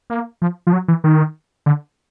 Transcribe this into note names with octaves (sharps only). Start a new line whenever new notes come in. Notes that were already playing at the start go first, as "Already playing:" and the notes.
A#3
F3
F3
F#3
E3
D#3
D3